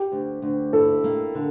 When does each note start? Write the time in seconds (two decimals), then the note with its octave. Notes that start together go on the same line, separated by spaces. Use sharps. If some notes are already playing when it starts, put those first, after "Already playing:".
Already playing: G4
0.12 D2
0.42 D2
0.73 E4 A4
1.04 A#3
1.35 D3